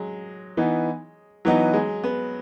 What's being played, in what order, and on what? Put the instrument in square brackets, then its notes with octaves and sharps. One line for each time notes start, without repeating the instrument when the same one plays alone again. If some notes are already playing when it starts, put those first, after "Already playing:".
Already playing: [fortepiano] F#3 G#3
[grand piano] E3 B3 D#4
[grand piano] E3 B3 D#4 [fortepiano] F#3
[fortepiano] G#3
B3